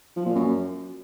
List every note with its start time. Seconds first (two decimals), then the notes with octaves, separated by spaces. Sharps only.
0.16 F3
0.26 A#2
0.35 F#2